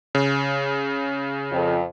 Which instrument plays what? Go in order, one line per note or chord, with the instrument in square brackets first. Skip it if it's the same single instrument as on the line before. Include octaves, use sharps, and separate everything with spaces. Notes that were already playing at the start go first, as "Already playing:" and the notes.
[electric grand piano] C#3
[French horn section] F2